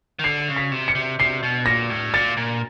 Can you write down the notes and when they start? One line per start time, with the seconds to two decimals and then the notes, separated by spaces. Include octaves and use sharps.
0.19 D#3
0.24 D3 C7
0.48 C#3
0.56 B6
0.72 C3
0.88 C#7
0.95 C3
1.19 C3 C7
1.43 B2
1.66 A#2 A#6
1.90 A2
2.14 A#2 A6
2.37 A#2